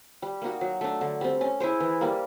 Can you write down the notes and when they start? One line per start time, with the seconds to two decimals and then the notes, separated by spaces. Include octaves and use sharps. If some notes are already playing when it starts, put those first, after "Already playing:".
0.22 G3
0.42 A#3 D#4 F#4
0.61 F#3
0.81 A3 D4
1.01 D3
1.21 G3 C4
1.41 C#4
1.60 E4 G#4 C5
1.80 E3
2.01 G3 A#3